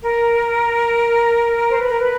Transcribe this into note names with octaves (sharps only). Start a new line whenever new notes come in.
A#4
C5
B4
A#4
B4